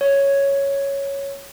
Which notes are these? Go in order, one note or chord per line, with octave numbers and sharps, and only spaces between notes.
C#5